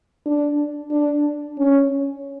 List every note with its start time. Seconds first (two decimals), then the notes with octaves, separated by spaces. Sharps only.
0.26 D4
0.91 D4
1.58 C#4